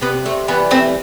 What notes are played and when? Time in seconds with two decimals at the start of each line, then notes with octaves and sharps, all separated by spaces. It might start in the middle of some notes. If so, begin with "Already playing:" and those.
0.01 C3 B3
0.26 A3
0.48 E3 G3 B3
0.71 A3 C4